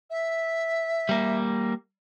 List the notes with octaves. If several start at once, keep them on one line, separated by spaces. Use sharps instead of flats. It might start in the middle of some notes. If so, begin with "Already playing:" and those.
E5
G3 A#3